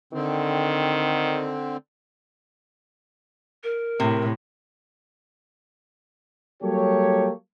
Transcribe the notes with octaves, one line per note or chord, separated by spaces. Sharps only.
D3 D#3 C4
A#4
A2 C3
F#3 G3 A#3 G4 A4 C#5